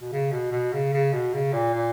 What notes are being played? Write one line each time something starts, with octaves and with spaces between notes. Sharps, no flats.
B2
C#3
B2
B2
C#3
C#3
B2
C#3
A#2
A#2